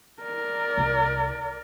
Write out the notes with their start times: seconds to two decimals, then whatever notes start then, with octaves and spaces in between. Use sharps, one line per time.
0.23 A#4 D5
0.77 C2